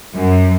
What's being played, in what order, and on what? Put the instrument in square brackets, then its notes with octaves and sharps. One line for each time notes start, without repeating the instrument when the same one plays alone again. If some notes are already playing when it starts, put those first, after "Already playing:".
[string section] F#2